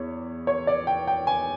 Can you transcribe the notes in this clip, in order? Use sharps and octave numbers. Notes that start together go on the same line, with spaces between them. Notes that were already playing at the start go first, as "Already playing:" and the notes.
Already playing: E2 C#5
C#5
D5
G5
G5
G#5